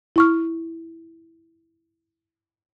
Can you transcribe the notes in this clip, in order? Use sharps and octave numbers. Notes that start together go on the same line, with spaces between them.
E4 C#6 F6